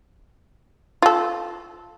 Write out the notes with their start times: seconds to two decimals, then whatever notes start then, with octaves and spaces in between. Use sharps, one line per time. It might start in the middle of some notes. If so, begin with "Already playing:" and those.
1.02 F4 A4